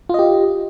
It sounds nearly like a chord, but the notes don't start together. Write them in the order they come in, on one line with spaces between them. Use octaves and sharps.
F4 D#5 G4